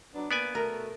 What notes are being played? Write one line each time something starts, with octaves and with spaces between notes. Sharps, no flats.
F#3 B3 D4
A#3 B3 B4 D5 G#5
B2 A3 A#4